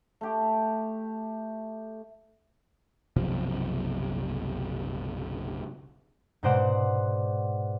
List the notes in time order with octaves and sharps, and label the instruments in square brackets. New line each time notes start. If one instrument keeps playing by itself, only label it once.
[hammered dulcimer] A3 G4
[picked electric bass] F#1 B1 C3 F3
[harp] G#2 B2 C5 D5 F#5 E7